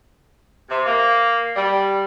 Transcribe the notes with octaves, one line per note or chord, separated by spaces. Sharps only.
C3
A#3
G3